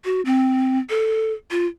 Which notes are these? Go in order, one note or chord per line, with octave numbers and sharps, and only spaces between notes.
F#4
C4
A4
F4